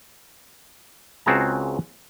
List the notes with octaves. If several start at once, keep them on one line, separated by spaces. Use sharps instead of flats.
C#2 C4 F#4 G#4 A5 A#5